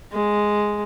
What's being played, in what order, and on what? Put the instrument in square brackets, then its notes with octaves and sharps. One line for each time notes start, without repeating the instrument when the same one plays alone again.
[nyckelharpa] G#3